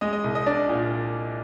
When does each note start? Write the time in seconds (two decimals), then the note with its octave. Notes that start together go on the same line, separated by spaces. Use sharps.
0.01 G#3 D#5
0.13 D#5
0.24 C2
0.35 D#5
0.46 D4 D5
0.69 A#2